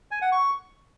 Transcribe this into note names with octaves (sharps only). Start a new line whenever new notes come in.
G#5
F#5
C#6